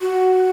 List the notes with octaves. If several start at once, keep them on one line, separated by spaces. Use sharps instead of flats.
F#4